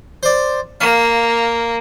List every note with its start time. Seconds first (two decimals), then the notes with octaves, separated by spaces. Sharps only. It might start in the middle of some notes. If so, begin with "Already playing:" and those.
0.23 C5 D5
0.81 A#3 F5